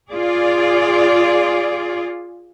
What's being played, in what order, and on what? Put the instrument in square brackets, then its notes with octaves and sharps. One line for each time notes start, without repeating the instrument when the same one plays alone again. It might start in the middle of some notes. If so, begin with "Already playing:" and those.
[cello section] F4 G#4 D5